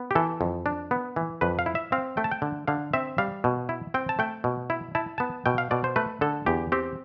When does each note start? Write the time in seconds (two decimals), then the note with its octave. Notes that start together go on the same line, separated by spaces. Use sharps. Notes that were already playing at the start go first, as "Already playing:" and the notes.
Already playing: B3
0.11 G4
0.15 E3 A4
0.41 F2
0.66 D4
0.91 B3
1.16 E3
1.41 F2 B4
1.59 F5
1.66 E4
1.75 E5
1.92 C4 F5
2.17 A3 G5
2.24 A5
2.31 G5
2.42 D3
2.68 D3 F5
2.93 C4 E5
3.18 G3 F5
3.44 B2
3.69 E4
3.94 C4 G5
4.09 A5
4.19 A3 G5
4.44 B2
4.70 E4
4.95 E4 A5
5.18 B3 A5
5.46 B2 G5
5.58 F5
5.71 B2 D5
5.84 C5
5.96 A3 B4
6.21 D3 A4
6.46 E2 G4
6.72 C4 G4